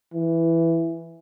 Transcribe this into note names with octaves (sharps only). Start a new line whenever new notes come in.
E3